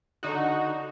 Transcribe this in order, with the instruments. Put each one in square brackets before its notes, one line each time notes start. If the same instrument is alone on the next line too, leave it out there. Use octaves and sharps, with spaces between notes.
[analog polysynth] D3 D#4 F#4